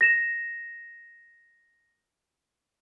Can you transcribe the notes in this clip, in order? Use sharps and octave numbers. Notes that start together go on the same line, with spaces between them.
A#6 E7